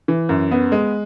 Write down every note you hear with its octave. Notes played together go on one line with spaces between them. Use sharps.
E3
F#2
B3
G#3